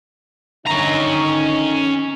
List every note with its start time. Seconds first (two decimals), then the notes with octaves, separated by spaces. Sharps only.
0.66 D3 D#3 C#4 D#4 A#5